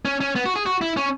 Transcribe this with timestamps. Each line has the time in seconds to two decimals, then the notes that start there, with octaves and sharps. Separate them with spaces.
0.05 C#4
0.21 C#4
0.36 B3
0.46 F#4
0.56 G#4
0.66 F#4
0.81 E4
0.97 C#4